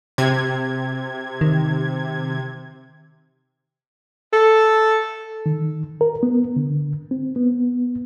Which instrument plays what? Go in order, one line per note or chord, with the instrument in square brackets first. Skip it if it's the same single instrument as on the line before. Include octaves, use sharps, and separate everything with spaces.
[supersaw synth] C3 G#6
[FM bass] D#3
[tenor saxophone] A4
[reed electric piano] D#3
A#4
B3
D3
C4
B3